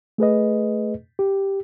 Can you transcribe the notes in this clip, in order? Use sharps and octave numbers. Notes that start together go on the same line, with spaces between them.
A3 G#4 B4 D#5
G4